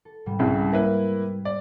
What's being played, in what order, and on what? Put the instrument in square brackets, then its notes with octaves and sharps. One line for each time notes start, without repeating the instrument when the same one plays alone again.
[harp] A4
G#2 C3 G3
[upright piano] C2 C#3 E4
A#3 E4 B4
D5